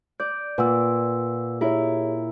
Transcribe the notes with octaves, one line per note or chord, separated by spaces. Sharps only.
D5 G6
A#2 B4 F#5 E6
E4 G4 G#4 A#4 C#5